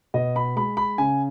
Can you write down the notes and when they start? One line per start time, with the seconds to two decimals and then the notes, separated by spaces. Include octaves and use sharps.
0.14 B2 D#5
0.36 B5
0.56 G#3 B5
0.77 B5
0.98 C#3 G#5